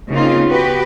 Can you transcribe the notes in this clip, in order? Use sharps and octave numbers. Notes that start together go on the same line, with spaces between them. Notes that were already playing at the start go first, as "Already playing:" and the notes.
C#3 A#3 C4 D#4 F4
B3 F#4 G4 B4